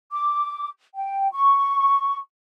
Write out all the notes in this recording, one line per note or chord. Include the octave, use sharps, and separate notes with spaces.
D6
G5
C#6